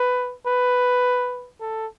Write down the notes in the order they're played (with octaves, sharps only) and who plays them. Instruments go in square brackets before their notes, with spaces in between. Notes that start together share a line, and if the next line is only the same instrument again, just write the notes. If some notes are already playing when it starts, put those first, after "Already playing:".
Already playing: [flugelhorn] B4
B4
A4